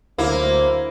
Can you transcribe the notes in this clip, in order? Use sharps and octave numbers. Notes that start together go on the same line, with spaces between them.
D2 F#3 A#3 E4 C5